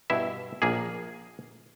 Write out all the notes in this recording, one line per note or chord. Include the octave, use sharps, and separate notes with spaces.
G2 B2 E4 E5
A#1 A#3 G#4